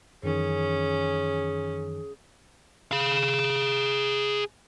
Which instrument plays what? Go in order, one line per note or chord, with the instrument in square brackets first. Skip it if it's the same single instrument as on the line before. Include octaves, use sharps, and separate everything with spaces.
[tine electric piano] F#2 D#3 E3 [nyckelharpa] C#4 [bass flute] G#4
[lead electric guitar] G#4 F5